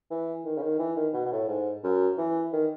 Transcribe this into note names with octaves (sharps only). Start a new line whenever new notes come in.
E3
D#3
C#3
D#3
E3
D#3
B2
B2
A2
G#2
F#2
E3
D#3